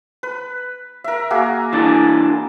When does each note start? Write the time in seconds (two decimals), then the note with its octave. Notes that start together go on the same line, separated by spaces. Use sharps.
0.23 B4
1.04 A#4 E5
1.30 A#3 F#4 G#4
1.73 E3 D4 D#5